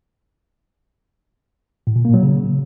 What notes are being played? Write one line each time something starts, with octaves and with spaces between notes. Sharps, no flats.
A2
A#2
A#3
F#3
C#3